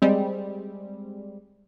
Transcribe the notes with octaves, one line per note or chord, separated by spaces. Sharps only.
G3 G#3 C4